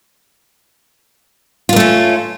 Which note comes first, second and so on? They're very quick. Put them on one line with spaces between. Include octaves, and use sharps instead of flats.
F4 A#3 A3 C#4